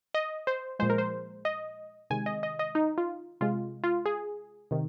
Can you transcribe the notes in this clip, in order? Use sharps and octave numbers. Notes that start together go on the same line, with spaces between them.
D#5
C5
A#2 F3 G#3 C5
A#4
C5
D#5
C3 D#3 G#3 G#5
D#5
D#5
D#5
D#4
F4
C3 G#3 F4
F4
G#4
C3 D#3